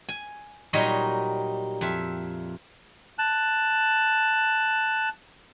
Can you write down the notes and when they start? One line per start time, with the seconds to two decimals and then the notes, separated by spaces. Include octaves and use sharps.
0.09 G#5
0.73 A#2 F#3 G3 D#4 C#5 D#5
1.81 F2 E5
3.19 A5 F#6